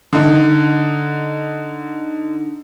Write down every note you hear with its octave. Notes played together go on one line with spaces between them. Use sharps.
D3 D#4